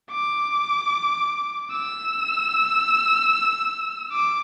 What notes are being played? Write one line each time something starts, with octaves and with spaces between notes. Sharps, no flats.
D6
E6
D6